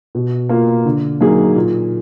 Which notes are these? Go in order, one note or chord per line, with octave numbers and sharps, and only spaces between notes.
B2
A#3 F4
D3
F#3 A#3 D#4 G#4
A#2